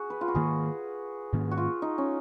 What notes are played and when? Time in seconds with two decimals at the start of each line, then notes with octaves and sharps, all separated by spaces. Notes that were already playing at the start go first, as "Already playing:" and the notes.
Already playing: F#4 G#4
0.10 B4
0.21 F4
0.28 F#4
0.34 G#2 D#3 A#3 G#4
1.32 G#2 D#3 A#3 C#4
1.51 F#4
1.57 F4
1.82 D#4
1.98 C#4